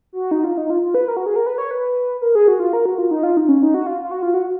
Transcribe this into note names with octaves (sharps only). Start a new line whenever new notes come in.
F#4
D#4
F4
D#4
F4
F4
B4
A#4
F#4
G#4
A#4
B4
C#5
B4
A#4
G#4
F#4
F4
A#4
F#4
F4
D#4
F4
D#4
C#4
D#4
F#4
F4
F4
F#4
F4
F#4